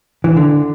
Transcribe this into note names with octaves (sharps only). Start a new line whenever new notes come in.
E3
D3